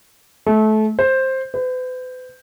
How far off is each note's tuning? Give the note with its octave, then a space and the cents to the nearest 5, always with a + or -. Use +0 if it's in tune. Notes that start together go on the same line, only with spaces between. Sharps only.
A3 -25
C5 +10
B4 +45